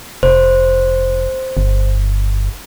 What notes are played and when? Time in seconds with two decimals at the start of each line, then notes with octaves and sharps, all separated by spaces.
0.23 F1 C5
1.57 G1